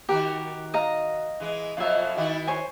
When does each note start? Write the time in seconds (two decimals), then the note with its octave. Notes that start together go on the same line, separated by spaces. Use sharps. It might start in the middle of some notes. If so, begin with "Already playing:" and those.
0.09 D#3 F#4 G4 A#4
0.74 D#5 F5 A#5
1.40 E3 G#3
1.77 F2 B2 F#3 F4 E5
2.17 D#3 E4 F#4
2.47 C5 C#5 G#5